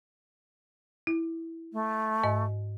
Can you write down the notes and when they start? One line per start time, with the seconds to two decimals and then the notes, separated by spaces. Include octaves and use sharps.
1.07 E4
1.73 A3
2.23 G#2 D#5